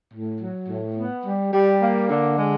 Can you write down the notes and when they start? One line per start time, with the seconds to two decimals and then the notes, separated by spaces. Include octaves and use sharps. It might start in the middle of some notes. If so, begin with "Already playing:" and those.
0.13 A2
0.40 F#3
0.68 A2
0.97 B3
1.25 G3
1.53 G3
1.81 A#3
2.10 D3
2.38 G#3